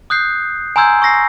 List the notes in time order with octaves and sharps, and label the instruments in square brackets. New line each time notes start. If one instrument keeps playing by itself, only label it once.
[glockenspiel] D#6 F#6 G6 C7
G#5 A#5 C6 E6 G6 G#6
C#6 E6 A#6 C7